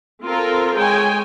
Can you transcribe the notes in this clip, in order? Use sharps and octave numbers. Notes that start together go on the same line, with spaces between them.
C4 F4 A4 A#4
G#3 C#5 G5 G#5